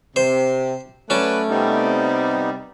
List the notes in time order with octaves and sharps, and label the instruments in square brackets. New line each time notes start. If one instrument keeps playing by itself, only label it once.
[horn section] C3 [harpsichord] C5
[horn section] F#3 B4 D5 [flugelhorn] A3 [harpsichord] C#4 A5
[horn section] C3 G3 [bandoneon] B3 D#4